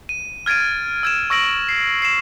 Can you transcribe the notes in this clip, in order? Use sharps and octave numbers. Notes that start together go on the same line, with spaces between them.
D#7
F6 G#6 A6 D7 D#7
E6 G#6 E7
C#6 E6 A#6 D7 F#7
C7
C7 E7